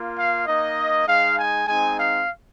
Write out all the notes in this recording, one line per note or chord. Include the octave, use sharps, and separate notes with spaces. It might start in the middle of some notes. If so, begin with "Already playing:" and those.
Already playing: A#3 F4
F5
A#3 D#4 D#5
G#3 D#4 F5
G#5
G#3 C4 D#4 G#5
F5